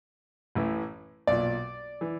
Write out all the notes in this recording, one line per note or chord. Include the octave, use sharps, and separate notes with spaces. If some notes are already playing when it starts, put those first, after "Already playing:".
A1 A2 E3
B1 A#2 D5
E3